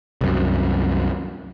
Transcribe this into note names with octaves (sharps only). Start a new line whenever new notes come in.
C2 F#2